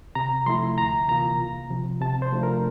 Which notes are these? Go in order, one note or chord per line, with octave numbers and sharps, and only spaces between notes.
C3 A#5
F3 A3 E4 C6
D2 A#5
C3 E3 A#3 F4 A#5
C2
C3 F3
C3 A5
C5
F3 A3 D4 F4
A#4